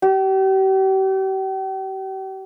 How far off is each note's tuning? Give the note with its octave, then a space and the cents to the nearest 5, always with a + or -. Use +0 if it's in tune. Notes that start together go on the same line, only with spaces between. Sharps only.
G4 -40